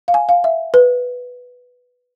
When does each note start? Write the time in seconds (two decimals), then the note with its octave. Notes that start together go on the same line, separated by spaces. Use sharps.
0.08 F5
0.14 G#5
0.29 F5
0.44 E5
0.74 B4